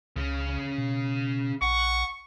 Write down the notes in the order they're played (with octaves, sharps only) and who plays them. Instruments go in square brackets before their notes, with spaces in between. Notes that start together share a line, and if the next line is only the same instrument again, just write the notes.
[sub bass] C#2 [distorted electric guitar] C#3 C#4
[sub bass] B2
[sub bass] A#1 [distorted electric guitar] F#5 [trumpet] C#6